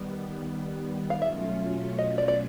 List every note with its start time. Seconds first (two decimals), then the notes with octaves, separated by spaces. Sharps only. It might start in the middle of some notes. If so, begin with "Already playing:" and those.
Already playing: D#3 G3 B3
1.10 F5
1.21 B2 F#3 A3 C#4 F4 E5
1.99 D#5
2.18 D5
2.28 D5